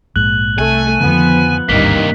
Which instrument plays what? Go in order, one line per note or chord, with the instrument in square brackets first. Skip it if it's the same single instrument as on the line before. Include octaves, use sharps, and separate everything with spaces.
[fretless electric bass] A#1 G#2 [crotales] F#6 F#7
[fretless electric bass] C2 [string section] A3 [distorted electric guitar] G#5
[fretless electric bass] F2 D3 D#3 [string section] F3 B3
[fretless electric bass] G#1 D2 [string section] G2 D#3 [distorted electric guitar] C3 A#3 [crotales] B6